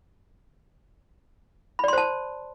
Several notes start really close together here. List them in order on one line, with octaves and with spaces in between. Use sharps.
B5 D5 C6 C5 A5